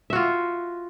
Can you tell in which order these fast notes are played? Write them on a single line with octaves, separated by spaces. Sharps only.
E5 F#4 F4